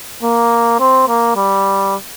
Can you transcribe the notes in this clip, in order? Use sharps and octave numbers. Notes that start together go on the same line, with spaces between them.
A#3
C4
A#3
G3